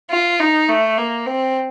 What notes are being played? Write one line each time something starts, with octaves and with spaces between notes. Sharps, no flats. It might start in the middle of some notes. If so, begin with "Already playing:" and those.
F4
D#4
A3
A#3
C4